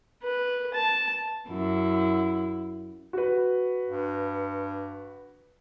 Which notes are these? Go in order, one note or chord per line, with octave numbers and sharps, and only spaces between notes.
B4
A5
F#2 E4
F#4 B4
G2